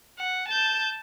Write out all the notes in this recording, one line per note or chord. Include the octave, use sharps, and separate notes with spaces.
F#5
A5 G6